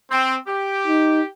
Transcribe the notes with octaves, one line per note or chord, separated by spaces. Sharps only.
C4
G4
D#4